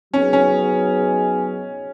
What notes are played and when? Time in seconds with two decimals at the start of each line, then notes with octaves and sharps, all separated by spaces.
0.13 F#3 B3 C#4 D#4 G#4
0.33 C#4